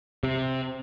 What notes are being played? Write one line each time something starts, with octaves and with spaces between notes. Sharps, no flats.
C3